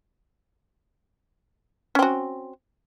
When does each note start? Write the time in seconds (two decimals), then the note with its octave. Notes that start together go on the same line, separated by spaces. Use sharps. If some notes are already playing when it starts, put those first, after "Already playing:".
1.95 C#4
1.99 C4
2.02 F#4